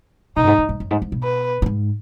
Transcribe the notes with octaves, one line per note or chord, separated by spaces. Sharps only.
B2 D#4
F#2
G#2
G#2
G#2
F#2
G#2
G#2
B2
B4
B2
G#2